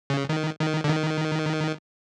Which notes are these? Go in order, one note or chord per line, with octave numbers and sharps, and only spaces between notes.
C#3
D#3
D#3
D3
D#3